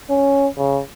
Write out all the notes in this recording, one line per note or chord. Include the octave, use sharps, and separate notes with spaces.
C#4
C#3